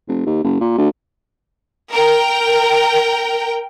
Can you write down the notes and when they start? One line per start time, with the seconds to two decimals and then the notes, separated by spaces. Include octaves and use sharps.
0.09 F1
0.27 D#2
0.44 F#1
0.60 A#2
0.78 D2
1.92 A#4 G5